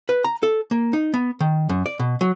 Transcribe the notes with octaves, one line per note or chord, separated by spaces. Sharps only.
B4
A#5
A4
A#3
D#4
B3
D#3
F#2
D5
B2
F#3